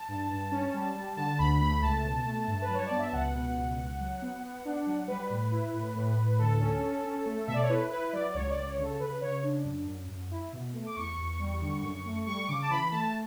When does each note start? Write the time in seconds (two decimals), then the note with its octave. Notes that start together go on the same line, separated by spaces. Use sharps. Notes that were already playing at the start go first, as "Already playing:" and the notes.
Already playing: A5
0.09 G2
0.30 G2
0.52 C#4
0.74 G3
0.95 G3
1.17 D3 A5
1.39 D2 B5
1.61 A3 B5
1.82 C#2 A5
2.04 B2
2.26 A3
2.48 G2
2.62 B4
2.68 F#3
2.75 C#5
2.86 B3 D5
2.99 E5
3.12 C#2 F#5
3.34 B2
3.56 C#2
3.77 C#2
4.00 F#3
4.22 B3
4.43 B3
4.65 D4
4.87 F#3
5.08 G3 B4
5.30 A2
5.51 E4
5.73 A2
5.95 A2
6.17 A2
6.39 D2 A4
6.60 C#4
6.82 C#4
7.05 C#4
7.26 A3
7.47 B2 E5
7.54 D5
7.62 C#5
7.69 E4 B4
7.91 E4 B4
8.13 F#3 D5
8.30 D5
8.34 C#2 C#5
8.51 D5
8.56 C#2
8.67 C#5
8.78 C#3 A4
9.00 C#3 B4
9.21 C#3 C#5
9.43 D4
9.65 F#2
9.87 F#2
10.08 F#2
10.31 E4
10.53 B2
10.74 A3
10.86 D6
10.96 E2 C#6
11.18 E2
11.40 G3
11.61 D3
11.82 F#2
12.05 A3
12.26 G3 C#6
12.48 C#3 D6
12.62 A5
12.70 E3 B5
12.91 A3 A5